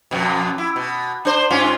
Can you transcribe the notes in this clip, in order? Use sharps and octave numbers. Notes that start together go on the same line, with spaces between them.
F2 B2
E4
B2
D4 C5
G2 C#4 F4